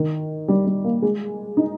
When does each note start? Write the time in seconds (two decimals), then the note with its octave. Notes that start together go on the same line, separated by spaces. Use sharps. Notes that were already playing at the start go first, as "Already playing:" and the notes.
Already playing: D#3
0.48 G3
0.66 G3
0.84 A#3
1.02 G#3
1.57 D#4